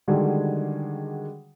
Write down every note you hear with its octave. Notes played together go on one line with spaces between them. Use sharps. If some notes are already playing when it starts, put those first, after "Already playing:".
D3 D#3 G3 G#3 F#4 G#4